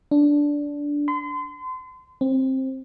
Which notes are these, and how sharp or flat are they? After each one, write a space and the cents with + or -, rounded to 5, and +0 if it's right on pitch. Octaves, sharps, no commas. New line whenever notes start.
D4 -10
C6 -35
C4 +15